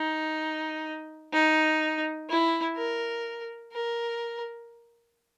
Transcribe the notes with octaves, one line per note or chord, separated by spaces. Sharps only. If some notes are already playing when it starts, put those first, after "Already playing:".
Already playing: D#4
D#4
E4
A#4
A#4